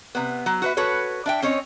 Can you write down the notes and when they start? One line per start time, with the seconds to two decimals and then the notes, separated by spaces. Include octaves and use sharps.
0.15 C3 B3
0.46 F#3
0.62 F#4 B4 E5
0.77 F#4 A4 B4 C#5
1.26 D4 E5 G5
1.42 C4 C#4 C#5 D#5